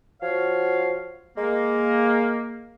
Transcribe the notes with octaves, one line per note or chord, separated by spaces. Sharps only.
F3 F#4 C#5 F5
G#3 A#3